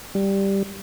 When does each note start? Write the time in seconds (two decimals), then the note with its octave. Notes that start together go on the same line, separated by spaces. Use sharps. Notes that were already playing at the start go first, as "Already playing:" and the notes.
0.15 G3